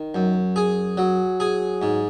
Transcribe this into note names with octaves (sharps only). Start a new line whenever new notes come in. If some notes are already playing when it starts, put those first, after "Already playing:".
Already playing: D#3
F#2
G#4
F#3
G#4
G#2